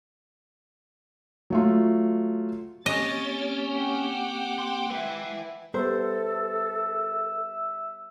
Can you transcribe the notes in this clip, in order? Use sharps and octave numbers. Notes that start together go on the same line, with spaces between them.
F#3 A3 F4
A#3 C4 C#4 G4 D#5 A6
F#5 G5 D6
C6
G#3 B4 E5
G3 B3 A4 C5 E5